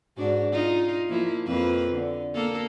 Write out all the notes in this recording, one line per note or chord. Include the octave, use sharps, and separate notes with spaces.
G#2 D4 F#4
D#4 F4
F3 A#3 E4
F2 A#3 B4
D3
A#3 A4